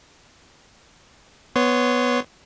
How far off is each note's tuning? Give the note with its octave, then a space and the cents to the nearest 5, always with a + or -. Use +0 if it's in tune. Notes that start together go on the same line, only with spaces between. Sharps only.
B3 +0 C#5 +0 C6 -20